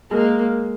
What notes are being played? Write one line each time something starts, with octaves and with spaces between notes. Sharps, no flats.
G#3 A#3